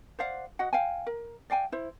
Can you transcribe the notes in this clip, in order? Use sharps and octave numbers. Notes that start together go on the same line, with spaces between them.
C5 D5 F5 F#5
F#4 D#5 F#5
F5 G5 G#5
A#4
D5 F5 G5 G#5
E4 C5